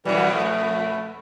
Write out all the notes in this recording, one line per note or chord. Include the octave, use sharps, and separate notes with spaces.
F2 B2 E3 G3
A3